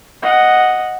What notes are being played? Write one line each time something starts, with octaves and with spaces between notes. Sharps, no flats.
D#5 F#5